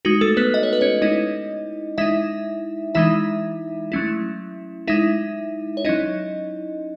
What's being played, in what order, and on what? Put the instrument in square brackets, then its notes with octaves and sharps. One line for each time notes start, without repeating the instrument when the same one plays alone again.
[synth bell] G#3 D#4 F#4
A3 A4
B3 B4
D#5
C#5
B4
C#4 C#5
G#3 C#4 D#4 E4 D#5
G#3 D#4 E4 E5
E3 G#3 D#4 E4 E5
F#3 A3 C#4 E4
G#3 D#4 E4 E5
C#5
F#3 C#4 D#4 E4 D#5